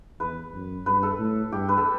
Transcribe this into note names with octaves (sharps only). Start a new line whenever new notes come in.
E2 B4
F#2
G2 B4
A4
A2
G2 G4
B4
A4